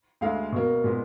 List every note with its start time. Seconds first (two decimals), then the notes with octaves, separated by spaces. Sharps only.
0.21 D2 D3 G#3 F5
0.52 B2 A#3
0.84 A#2 G#3 B3